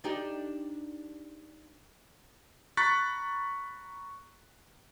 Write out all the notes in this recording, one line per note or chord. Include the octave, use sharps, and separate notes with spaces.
D4 D#4 G4
A#5 B5 C#6 F#6 A6 B6